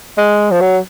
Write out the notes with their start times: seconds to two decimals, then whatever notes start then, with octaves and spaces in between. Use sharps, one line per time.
0.18 G#3
0.51 F3
0.61 F#3